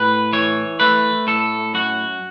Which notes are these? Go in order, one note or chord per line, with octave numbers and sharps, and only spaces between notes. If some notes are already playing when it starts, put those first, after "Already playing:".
Already playing: A2 B4
E3 C#5
A3 B4
A2 A4
F#2 F#4